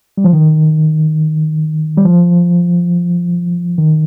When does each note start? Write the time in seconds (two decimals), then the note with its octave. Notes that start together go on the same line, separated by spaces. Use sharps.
0.17 G3
0.24 F3
0.33 D#3
1.97 G3
2.05 F3
3.78 D#3